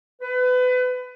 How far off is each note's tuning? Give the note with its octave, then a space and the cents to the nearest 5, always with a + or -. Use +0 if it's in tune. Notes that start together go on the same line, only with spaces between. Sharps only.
B4 +30